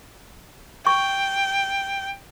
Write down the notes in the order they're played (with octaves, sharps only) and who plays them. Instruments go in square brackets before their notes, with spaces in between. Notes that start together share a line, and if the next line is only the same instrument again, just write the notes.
[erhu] G5 [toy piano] C#6